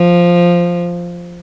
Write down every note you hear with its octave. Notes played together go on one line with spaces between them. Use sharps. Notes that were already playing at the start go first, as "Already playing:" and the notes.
Already playing: F3